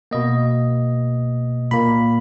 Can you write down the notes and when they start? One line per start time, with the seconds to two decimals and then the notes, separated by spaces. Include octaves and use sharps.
0.11 B2 A#3 D#5
1.71 A#2 A#3 B5